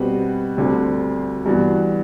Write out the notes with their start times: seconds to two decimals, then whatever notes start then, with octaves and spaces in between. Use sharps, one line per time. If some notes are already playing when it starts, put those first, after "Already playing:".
Already playing: B2 G3 C4 F#4 B4
0.57 D2 D3 G3 C4
1.46 G2 E3 B3 F#4